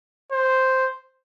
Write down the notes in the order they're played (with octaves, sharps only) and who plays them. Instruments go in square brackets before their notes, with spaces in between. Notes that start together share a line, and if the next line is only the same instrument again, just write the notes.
[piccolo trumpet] C5